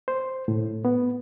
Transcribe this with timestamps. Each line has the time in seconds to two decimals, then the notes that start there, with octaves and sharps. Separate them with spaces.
0.08 C5
0.48 A2
0.85 B3